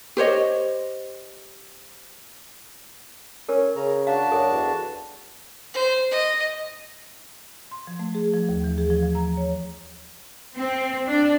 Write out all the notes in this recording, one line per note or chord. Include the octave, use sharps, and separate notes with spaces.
G4 C5 C#5 D#5
C#4 A#4
C#3 A#5
D4 F#4 F5 A5
F#2 A4
E2
C5
D#5
C6
F3
A3
G#4
F3
D#2
E3
G#4
F3
F3
A#5
C#5
C4
D4